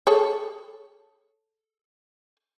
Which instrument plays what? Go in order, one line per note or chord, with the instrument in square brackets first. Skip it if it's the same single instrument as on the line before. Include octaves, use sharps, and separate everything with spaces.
[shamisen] G#4 A4 C#5